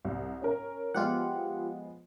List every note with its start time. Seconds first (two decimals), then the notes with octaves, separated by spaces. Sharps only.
0.05 C2
0.42 C#4 A#4
0.94 F3 G#3 B3 F4 G4 F#5